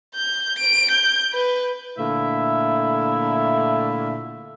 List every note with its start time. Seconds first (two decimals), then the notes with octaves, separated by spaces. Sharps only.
0.15 G6
0.59 D7
0.92 G6
1.34 B4
1.99 A#2 D3 A3 E4 E5 F5